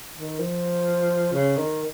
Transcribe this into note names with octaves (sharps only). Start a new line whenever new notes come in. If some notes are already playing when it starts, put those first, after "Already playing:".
D#3
F3
C#3
D#3